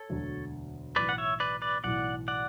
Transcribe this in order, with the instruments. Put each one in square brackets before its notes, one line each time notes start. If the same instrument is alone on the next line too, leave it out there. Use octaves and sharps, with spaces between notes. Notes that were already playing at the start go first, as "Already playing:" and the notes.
Already playing: [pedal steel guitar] A4 C#5
[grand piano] E1 D2 D3 F#3
[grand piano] B1 A2 E3 [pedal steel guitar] B4 D5
[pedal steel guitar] F#5
C#5 E5
B4 D5
B4 D5
[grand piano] B1 A2 E3 [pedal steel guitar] D5 F#5
[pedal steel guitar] D5 F#5